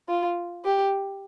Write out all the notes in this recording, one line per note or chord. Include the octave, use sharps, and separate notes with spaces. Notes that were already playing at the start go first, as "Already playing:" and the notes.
F4
G4